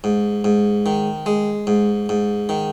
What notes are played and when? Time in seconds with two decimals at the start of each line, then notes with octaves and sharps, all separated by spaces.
0.04 G#2
0.44 G#2
0.86 D#3
1.26 G#3
1.67 G#2
2.09 G#2
2.49 D#3